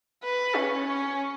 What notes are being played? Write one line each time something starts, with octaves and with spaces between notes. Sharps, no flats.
B4
C#4
C#4